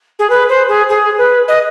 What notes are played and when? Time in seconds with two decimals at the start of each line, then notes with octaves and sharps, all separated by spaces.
0.19 G#4
0.29 B4
0.49 C5
0.68 G#4
0.89 G#4
1.17 B4
1.48 D#5